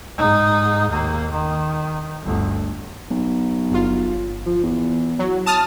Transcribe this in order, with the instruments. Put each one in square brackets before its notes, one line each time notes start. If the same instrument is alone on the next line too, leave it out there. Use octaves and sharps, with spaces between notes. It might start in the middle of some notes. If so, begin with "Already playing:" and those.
[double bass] G#2 D#4
D#2 A#3
D#3
G1 D2
[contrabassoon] B1
[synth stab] G1 F4
[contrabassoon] F3
E2
[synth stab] F#3
A5 D#6 F6